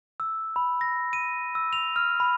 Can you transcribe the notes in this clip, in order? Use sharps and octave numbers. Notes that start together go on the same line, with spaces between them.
E6
B5
A#6
D#7
E6
F7
F6
B5